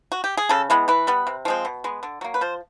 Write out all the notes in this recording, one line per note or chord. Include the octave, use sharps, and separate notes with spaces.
F#4
G4
G#4
C#3 A4
E3 G#3 B3
E3 B4
G3 B3
C3
F3 G#3 C4
B2
G#3 B3
D3
F#3 A#3
B4
F3 C5